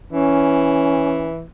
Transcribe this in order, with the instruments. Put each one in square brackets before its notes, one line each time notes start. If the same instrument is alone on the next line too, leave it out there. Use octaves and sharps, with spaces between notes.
[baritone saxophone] E3 [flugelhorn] C#4